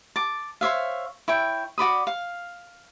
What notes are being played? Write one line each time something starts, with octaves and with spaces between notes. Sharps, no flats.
A5 D6
C5 C#5 E5 F5
E4 C#5 G5
F#4 D5 B5 D#6
F5